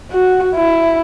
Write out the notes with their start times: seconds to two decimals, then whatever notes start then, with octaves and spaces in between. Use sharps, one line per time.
0.11 F#4
0.55 E4